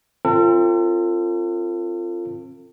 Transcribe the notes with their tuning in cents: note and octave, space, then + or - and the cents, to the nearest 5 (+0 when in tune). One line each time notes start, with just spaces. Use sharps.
C4 +25 F4 -15 A4 +40